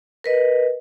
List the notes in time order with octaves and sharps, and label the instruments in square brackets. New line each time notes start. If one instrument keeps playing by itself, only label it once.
[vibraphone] A#4 B4 D#5